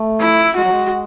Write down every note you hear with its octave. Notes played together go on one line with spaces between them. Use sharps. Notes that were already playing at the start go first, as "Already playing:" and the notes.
Already playing: A3
E4
G#3 F#4
F#3
G#3